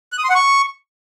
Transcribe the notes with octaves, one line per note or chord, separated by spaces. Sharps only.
F#6
D#6
C6
F#5
C#6